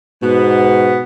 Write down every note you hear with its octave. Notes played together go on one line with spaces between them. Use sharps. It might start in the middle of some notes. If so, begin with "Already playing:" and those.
G#2 B2 B3